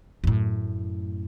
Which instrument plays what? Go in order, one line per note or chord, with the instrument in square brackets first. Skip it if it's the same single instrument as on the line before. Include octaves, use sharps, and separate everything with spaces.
[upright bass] F#2 A2